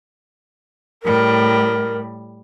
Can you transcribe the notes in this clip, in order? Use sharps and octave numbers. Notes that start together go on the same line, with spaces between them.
A2 G3 A#4